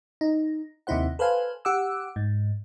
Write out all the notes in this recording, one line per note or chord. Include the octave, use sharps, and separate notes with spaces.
D#4
D#2 C3 D#4 E4 C5 F#5
A4 B4 C5 F5 G#5
G4 F#5 D6 E6
G#2